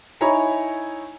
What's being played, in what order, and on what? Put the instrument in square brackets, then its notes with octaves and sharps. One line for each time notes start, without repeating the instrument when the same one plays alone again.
[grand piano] D#4 E4 C#5 G#5 A#5 B5